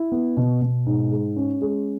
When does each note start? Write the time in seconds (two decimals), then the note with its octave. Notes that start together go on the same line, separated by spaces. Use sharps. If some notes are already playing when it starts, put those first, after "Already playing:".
Already playing: E4
0.12 B3
0.37 B2
0.62 B2
0.86 G#2
1.12 G#3
1.36 C#4
1.62 G#3